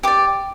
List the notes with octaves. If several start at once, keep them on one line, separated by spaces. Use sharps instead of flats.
G4 D5 D6